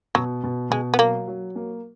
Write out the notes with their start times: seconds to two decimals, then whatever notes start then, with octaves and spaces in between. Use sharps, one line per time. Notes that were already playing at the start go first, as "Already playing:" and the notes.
0.15 B2 F#3
0.44 B2
0.71 B2 G#3
0.94 B3
0.99 F#3 A#3
1.28 F#3
1.56 A#3